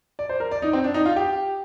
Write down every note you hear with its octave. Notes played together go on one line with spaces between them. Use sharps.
D5
C5
A#4
D5
D#4
C4
D4
D#4
F4
G4